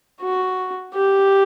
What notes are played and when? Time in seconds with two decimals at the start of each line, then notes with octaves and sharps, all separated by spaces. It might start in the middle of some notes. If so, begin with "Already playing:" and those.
0.21 F#4
0.95 G4